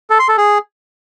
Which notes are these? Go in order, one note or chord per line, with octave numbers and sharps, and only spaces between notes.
A4
C6
A4
G#4